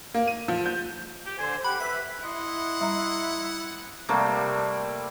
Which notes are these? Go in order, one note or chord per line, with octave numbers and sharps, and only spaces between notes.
A#3
D#7
F3
G6
G4
D3 C5 G#5
G4 F#5 B5
B4 E5 B6
E4 D#5 F#5 C6
G3 E5 A#5
C3 G3 A3 A#3